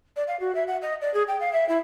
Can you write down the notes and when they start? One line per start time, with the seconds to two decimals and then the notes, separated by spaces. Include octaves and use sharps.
0.16 D5
0.27 F5
0.39 F#4
0.54 E5
0.67 F#5
0.82 D#5
1.01 D5
1.13 G#4
1.27 G5
1.40 F5
1.52 E5
1.68 E4